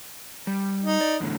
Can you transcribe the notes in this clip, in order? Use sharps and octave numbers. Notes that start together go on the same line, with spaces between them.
G3
D#4
D5
E2 A2 D3